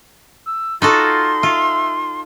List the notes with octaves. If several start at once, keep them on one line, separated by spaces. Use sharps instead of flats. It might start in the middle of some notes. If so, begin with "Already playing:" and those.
E6
D#4 F4 F#4 A4 C6
F4 E5